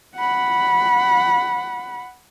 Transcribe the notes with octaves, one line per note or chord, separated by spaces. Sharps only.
F#5 B5